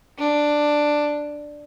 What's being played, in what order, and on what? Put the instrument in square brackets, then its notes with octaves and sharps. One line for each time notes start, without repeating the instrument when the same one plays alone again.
[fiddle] D4